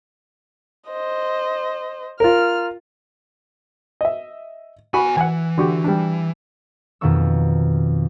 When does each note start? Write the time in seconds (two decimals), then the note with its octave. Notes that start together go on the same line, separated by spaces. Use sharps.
0.88 C5 D#5
2.20 F4 A#4 F6
4.01 D#5 E5
4.94 B3 F#4 G#5 B5
5.17 E3 F#5 G#5
5.58 D3 F#4 G4
5.84 G3 D4
7.01 F2 B2 D#3 A#3 C#6 E6